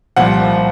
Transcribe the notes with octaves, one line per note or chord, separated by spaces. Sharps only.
C2 A#2 F3 F#5